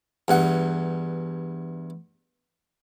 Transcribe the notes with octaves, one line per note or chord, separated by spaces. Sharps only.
E2 G2 F#5